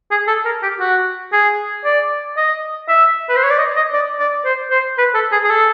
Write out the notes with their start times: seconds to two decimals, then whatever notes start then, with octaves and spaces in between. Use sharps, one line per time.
0.11 G#4
0.28 A4
0.45 A#4
0.63 G4
0.80 F#4
1.33 G#4
1.85 D5
2.37 D#5
2.89 E5
3.29 B4
3.36 C5
3.44 C#5
3.51 D5
3.58 D#5
3.76 D#5
3.93 D5
4.19 D5
4.45 C5
4.71 C5
4.98 B4
5.14 A4
5.32 G#4
5.44 G#4
5.50 A4